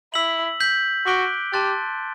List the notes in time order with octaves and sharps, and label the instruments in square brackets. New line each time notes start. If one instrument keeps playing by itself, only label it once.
[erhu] E4 [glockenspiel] E6 B6 F#7
[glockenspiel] G6 B6 F#7
[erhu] F#4 [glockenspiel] D6 F#6 B6 D7 G7
[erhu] G4 [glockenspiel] A5 C6 F#6 A6